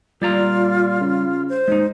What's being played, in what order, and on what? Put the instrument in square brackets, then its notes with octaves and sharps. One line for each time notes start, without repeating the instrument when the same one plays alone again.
[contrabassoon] A#2 [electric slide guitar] G3 D5 A#5 [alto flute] F4
[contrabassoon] C#3
[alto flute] C5
[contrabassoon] D#2 [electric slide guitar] G#3 D#4